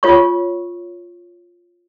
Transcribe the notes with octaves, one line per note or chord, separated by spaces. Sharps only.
F4 C#5 C#6